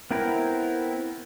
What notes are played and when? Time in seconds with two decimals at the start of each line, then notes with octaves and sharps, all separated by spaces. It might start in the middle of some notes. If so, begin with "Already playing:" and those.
0.11 B3 C4 E4 A#4